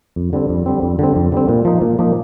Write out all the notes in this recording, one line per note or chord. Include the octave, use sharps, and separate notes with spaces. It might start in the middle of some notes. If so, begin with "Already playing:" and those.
F2
D3 G3 C4
F2
D3 G3 C4
F2
D3 G3 C4
F2
D3 G3 C4
A#2
F3 A#3 D#4
A#2
F3 A#3 D#4